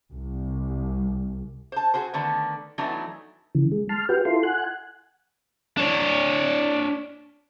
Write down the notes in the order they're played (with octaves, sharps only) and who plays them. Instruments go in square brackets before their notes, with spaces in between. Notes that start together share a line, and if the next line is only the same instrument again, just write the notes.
[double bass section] C2
[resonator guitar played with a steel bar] C5 A5
F#4 G#4 C5
D3 D#3 A3 B3 D4
E3 F#3 A3 B3 D4 D#4
[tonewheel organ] C#3 E3
G#3
A5 C6 F6
F#4 G4 B4 G5
E4 F4 A4 C6
F#5 G#5 F#6
[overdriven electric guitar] D4 C#5